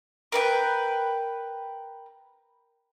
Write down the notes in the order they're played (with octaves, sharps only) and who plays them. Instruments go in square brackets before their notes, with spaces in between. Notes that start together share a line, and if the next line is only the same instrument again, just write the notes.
[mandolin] A#4 B4 G5